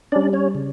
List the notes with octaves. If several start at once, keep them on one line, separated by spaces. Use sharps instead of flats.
G3 C#4 D4 D5
C#4 C#5
C#3